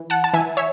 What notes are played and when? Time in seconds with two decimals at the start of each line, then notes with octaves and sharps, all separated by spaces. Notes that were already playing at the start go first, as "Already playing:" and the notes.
Already playing: E3
0.10 F#5 A5
0.24 A5
0.33 E3 E5 G#5
0.57 C#5 E5